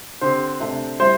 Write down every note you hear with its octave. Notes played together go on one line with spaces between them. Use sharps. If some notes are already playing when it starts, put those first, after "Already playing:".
D3 C4 G4 C5
C3 A3 D4
G3 E4 C5